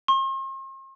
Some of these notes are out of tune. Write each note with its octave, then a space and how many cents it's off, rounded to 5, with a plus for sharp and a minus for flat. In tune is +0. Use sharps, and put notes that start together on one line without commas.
C6 +45